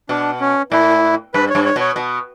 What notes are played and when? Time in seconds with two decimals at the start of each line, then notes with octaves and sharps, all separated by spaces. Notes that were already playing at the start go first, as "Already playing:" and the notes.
0.09 B2 D4
0.40 C#4
0.72 A2 E4
1.34 G2 B4
1.50 C#5
1.55 G2
1.65 C#5
1.76 B2 C#5
1.96 B2